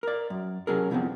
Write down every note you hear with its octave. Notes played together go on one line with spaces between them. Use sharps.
A#4 D5
F#2
C3 F#3 C#4 G#4 A#4
C2 F2 F3 B3 C4